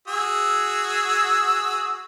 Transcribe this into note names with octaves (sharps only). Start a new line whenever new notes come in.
F#4 G#4 E6